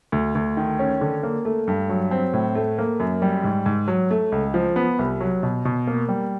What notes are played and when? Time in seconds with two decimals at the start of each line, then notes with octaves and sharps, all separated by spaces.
0.12 D2
0.35 D2
0.57 D#3
0.79 C#4
1.01 D3
1.23 A#3
1.45 A3
1.67 G2
1.90 F#3
2.11 C4
2.33 A2
2.55 A3
2.78 A#3
3.00 F#2
3.22 G3
3.44 G#2
3.66 G#2
3.88 F#3
4.11 A3
4.32 C#2
4.54 F3
4.76 B3
4.99 C2
5.21 F#3
5.43 B2
5.65 B2
5.87 A#3
6.08 G3